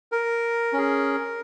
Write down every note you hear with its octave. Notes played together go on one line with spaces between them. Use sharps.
A#4
C#4 G#4